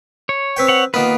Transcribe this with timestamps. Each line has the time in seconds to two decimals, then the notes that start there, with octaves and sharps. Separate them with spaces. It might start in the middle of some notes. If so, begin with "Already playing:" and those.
0.29 C#5
0.57 C4 B4 G5
0.68 C#5 F#5
0.94 D#3 A#3 B3 F4 B4